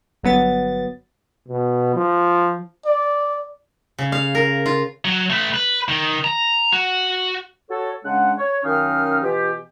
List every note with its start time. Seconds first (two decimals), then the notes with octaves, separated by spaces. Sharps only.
0.23 G1 F#3 B3 A6
1.48 B2
1.95 F3
2.86 D5
3.98 C#3
4.12 F5
4.35 A#4
4.66 F4
5.05 F#3
5.30 A3 B4
5.54 B4
5.89 D#3
6.24 A#5
6.72 F#4
7.70 F#4 A4 C#5
8.05 C#3 G#3 D4 F#5
8.38 C#5
8.64 F#2 D#3 C#4 D#4 F5 F6
9.22 B2 E3 F4 G4